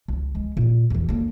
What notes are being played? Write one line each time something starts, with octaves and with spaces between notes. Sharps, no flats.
C#2
G#3
A#2
E2 E3
D3 A#3